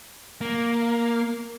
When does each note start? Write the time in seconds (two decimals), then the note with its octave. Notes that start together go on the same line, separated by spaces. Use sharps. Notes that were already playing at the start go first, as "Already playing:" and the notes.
0.41 A#3